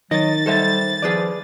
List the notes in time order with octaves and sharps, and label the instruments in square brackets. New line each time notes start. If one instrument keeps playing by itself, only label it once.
[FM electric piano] D#3 [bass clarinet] F#3 [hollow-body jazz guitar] D#5 [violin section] A6
[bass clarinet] G3 [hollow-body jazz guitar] A4 C5 E5
[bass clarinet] F3 [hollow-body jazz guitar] G#4 B4 D5